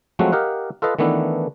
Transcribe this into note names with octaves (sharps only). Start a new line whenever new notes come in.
F3 F#3 G#3 A3 C4 F#4
G4 A#4 D#5 F5 F#5
F4 A4 B4 D#5 F5
D#3 E3 A3 B3 D4 E4